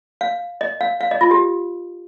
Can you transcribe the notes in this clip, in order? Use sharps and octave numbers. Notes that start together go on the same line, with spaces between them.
F5
D#5
F5
F5
D#5
F4
G4